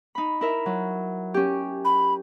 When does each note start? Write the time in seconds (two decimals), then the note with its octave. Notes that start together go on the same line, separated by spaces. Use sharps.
0.15 D#4 B5
0.41 E4 A#4 E5
0.66 F#3
1.34 C#4 G4
1.85 B5